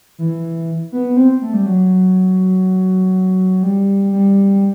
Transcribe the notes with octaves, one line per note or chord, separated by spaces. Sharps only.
E3
B3
C4
A3
G3
F#3
G3
G3